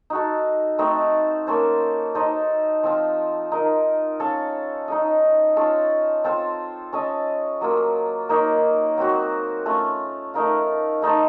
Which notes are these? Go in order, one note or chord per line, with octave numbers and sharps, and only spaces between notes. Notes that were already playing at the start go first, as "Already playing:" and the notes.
D#4 F#4 A4
A3 C4 D#4 A4
A#3 C#4 A4 C5
D#4 A4 C5 D#5
F3 C4 F4
D#4 A#4 D#5
C#4 A4 C#5 F5
D#4 A4 D#5
C#4 F4 A4
C4 F4 A4 C5
C#4 A4 D#5
F#3 A#3 F4
A#3 D#4 A#4 C#5
F#3 C4 F#4
A3 C#4 F4
A3 D#4 A#4 F5
A3 D#4 A4 C5